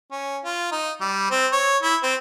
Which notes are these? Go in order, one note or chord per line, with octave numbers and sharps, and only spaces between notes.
C#4
F4
D#4
G3
C4
C#5
E4
C4